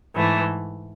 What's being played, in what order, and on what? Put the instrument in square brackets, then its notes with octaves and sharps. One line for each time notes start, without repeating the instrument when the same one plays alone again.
[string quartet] G#2 E3 A3